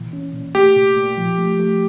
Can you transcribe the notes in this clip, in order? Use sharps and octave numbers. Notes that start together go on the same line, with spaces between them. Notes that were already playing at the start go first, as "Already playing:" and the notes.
Already playing: A#2 E3
C#4
A#2
A3 G4
A#2
A#2
F3
A3
A3